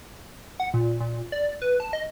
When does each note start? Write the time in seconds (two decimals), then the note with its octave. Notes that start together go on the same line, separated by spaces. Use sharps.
0.60 F#5
0.74 A#2
1.00 A#2
1.32 D5
1.62 B4
1.80 A5
1.93 D#5